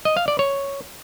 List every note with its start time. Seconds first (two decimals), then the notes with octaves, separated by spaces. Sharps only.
0.05 D#5
0.17 F5
0.28 D5
0.39 C#5